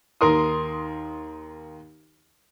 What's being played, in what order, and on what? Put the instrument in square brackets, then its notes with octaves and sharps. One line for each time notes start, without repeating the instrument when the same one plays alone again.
[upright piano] D#2 A#4 C6 D#6